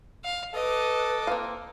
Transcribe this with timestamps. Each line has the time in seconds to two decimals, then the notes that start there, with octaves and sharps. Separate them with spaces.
0.24 F5
0.55 A4 B4 D#5 D6
1.27 A#3 C4 F5